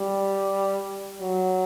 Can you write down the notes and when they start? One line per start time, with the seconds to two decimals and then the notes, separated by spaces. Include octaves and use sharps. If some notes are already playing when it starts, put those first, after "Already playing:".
Already playing: G3
1.22 F#3